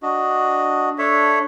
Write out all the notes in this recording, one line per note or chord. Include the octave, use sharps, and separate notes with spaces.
D4 F#4 D#5
D4 A4 C#5 E5